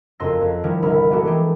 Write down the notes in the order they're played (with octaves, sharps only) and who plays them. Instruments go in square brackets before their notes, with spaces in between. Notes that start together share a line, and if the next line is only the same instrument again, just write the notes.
[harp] F#1 F2 D#5 C6 E6 A#6
F2
D#3 F3 G3 C#4 E4 A#4
G1 C2 E4 B5 F6
G#3 A#3 B3 F#4 G4 A4
E3 G#3 G4 A4